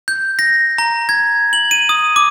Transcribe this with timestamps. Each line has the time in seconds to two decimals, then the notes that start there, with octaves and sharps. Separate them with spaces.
0.08 G6
0.39 A#6
0.78 A#5
1.09 G#6
1.53 F#7
1.71 D#7
1.89 D#6
2.16 D6